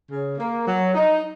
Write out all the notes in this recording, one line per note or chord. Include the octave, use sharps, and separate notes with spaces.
C#3
A#3
F#3
D#4